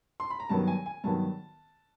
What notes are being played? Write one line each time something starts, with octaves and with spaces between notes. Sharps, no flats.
C6
B5
A#5
G2 D#3 F#3 B3 A5
G#5
G#5
G2 D#3 F#3 B3 A5